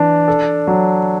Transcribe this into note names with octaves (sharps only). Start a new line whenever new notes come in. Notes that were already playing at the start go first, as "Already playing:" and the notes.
Already playing: E3 D4 D5
A4
F#3